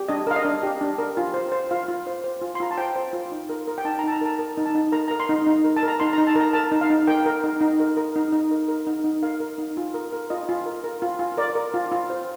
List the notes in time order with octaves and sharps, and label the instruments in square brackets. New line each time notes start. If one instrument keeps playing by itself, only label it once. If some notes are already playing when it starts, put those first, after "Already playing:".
Already playing: [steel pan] G4
D4 D#5
A#4 F5
D#5
D4
G4
D4
A#4
F4
C5
C5
F4 F5
F4
C5
C5
F4
C6
F4 A#5
A5
C5 G5
C5
F4
D#4
A#4
A#4
G5
D#4 A5
A#5
D#4 A5
A#5
A#4 A5
A#4
D#4
A5
D#4
A#4 A#5
A#4 A#5
C6
D#4
D#4
A#4
A5
A#4
A#5
D#4 C6
A#5
D#4
A5
A#4
A#5
A#4 A5
D#4
F5
D#4
A#4 G5
A#4
D#4
D#4
A#4
A#4
D#4
D#4
A#4
A#4
D#4
D#4
A#4 F5
A#4
D#4
F4
A#4
A#4
F4 D#5
F4
A#4
A#4
F4
F4
A#4 D5
A#4
F4
F4
C5